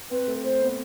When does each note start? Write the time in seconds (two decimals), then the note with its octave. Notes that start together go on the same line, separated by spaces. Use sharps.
0.11 C4 B4
0.28 A3
0.44 A3 C5
0.61 B3